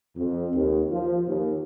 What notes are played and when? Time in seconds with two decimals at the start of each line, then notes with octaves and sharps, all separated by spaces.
0.17 F2
0.55 D#2
0.91 F3
1.27 D#2